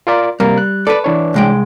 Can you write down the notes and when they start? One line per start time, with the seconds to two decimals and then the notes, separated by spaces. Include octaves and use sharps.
0.07 F4 A#4 D5
0.40 C3 G3 A#3 A#4
0.58 F#6
0.87 A4 B4 D5 B5
1.04 E3 D4 C#5
1.34 C2 G#3 G5